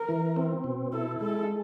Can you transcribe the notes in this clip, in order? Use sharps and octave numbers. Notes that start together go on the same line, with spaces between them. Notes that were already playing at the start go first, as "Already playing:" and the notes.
Already playing: A#4
E3
C4
B2
E4 A4
G#3 A4